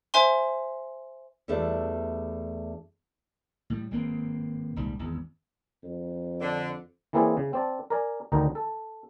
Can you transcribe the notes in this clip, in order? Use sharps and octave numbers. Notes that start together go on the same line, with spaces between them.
C5 E5 G#5 C6
E2 G3 A3 D4 E5
A2 G3
G#1 G2 A#3 C4
D#1 C2 G#2 G3
G#1 E2
F2
D3
E3 A#3 C4 E4 G#4 D5
C#3
C4 D5 A5
A#4 D5 G#5
D2 D3 D#3 D#4 A#5
A4